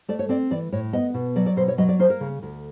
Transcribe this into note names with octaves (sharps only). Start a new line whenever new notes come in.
A3 D5
C#5
C4 D5
E3 D5
A2 C#5
B3 D#5
B2
F#3 D5
D5
B2 C5
C#5
F#3 D#5
D5
A#3 C5
A#4
C#3
D2